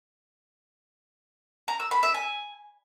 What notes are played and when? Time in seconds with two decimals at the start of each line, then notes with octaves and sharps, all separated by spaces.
1.68 A#5
1.80 E6
1.91 B5
2.03 E5
2.14 G#5